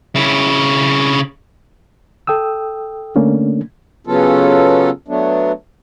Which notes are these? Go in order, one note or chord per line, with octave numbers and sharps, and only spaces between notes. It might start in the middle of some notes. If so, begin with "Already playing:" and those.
C#3 E4
A4 G5 D#6 E6
D3 A3 A#3 C#4 D4
C#3 F#3 B3 C#4 F4 A4
F#3 A3 B3 D4